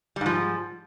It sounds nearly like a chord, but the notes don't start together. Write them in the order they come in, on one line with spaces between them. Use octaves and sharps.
G3 G#2 F3